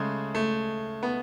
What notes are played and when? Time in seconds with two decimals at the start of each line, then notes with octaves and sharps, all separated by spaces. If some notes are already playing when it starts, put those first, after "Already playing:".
Already playing: C#3 G#3 A3
0.35 A3
1.03 B3